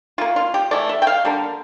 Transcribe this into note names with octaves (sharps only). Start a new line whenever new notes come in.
E3 A#3 F4
F4
G4
E3 A3 D5
E5
G5
F5
D3 G3 A#3